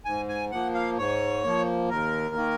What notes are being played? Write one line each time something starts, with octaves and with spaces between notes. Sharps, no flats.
G#2 G#5
G#5
F3 A#3 F#5
F5
G#2 C#5
F3 A#3
D#2 A#4
D#3 A#3